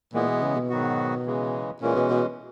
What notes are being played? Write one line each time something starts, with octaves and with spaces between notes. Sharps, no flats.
A#2 E3 G#3 B3
B2
C#3
B2
G#2 D#3 F#3 B3 F#4
C#3 E3 G#3
A#2 E3 G#3 C#4
B2
B2